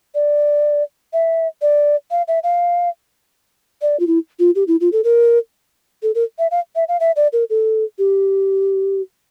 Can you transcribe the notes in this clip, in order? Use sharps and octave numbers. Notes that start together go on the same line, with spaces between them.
D5
E5
D5
F5
E5
F5
D5
F4
E4
F4
G4
E4
F4
A4
A#4
A4
A#4
E5
F5
E5
F5
E5
D5
A#4
A4
G4